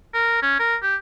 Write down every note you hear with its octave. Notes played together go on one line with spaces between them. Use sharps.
A#4
C#4
A#4
G4